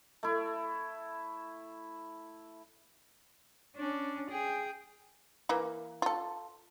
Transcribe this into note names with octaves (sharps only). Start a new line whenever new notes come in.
A3 E4
C#4 D4
G#4 G5
E3 A#3
F4 A4